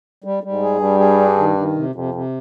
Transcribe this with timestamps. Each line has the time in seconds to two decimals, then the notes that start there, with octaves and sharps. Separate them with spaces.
0.24 G3
0.43 G3
0.52 G#2
0.62 G#4
0.81 G2 G3
1.00 G#4
1.19 D4
1.38 D#3
1.58 D#3
1.76 C3
1.95 F2 C3
2.14 C3